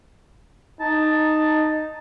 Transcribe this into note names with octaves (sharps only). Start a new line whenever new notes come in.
D#4 A5